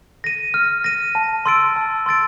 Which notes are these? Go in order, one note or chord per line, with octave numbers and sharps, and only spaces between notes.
A#6 D#7
F6
A#6 D#7
A5
C6 E6 A6 D7
A5
C6 E6 A6 D7